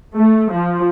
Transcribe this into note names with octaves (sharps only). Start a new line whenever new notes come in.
A3
F3